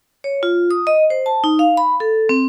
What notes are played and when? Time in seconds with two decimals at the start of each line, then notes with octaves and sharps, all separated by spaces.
0.24 C#5
0.43 F4
0.71 D#6
0.87 D#5
1.10 C5
1.26 A5
1.44 D#4
1.59 F5
1.77 B5
2.00 A4
2.29 C4